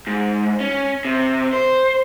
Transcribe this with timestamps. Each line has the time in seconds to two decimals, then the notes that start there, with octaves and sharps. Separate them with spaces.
0.07 G#2
0.61 C#4
1.05 C3
1.53 C5